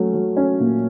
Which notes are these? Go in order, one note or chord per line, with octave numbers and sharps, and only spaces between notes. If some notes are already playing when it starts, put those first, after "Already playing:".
Already playing: F#3 A3 C#4
F#3
C#4
A#2